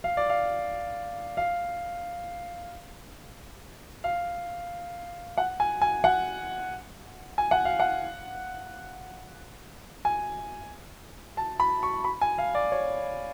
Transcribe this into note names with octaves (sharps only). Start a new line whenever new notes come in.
F5
D5
F5
F5
F5
F#5
G#5
G#5
F#5
G#5
F#5
F5
F#5
G#5
A5
B5
C#6
B5
G#5
F5
D5
C#5